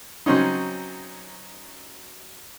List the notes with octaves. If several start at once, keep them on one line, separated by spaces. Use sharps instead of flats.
C#3 F#3 C4 C#4 D#4